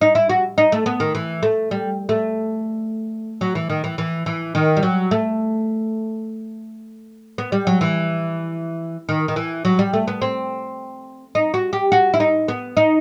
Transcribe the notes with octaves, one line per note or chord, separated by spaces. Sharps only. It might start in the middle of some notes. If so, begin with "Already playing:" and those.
D#4
E4
F#4
D#4
A3
B3
D#3
E3
A3
G3
A3
F#3
E3
D#3
E3
E3
E3
D#3
G3
F#3
A3
B3
G3
F#3
E3
D#3
D#3
E3
F#3
G3
A3
B3
C4
D#4
F#4
G4
F#4
E4
D#4
B3
D#4